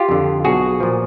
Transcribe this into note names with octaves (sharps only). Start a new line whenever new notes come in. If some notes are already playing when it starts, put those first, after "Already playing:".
Already playing: F4 G4
F2 D3
B1 F#4 G#4
A#2 F3